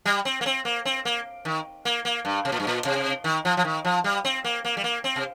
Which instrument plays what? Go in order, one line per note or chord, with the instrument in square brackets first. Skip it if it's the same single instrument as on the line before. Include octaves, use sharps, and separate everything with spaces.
[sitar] G3
C4
A#3
C4
A#3
C4
A#3
D#3
A#3
A#3
G2
C3
A#2
G2
A#2
C3
D#3
F3
F3
D#3
F3
G3
C4
A#3
A#3
G3
A#3
C4
C3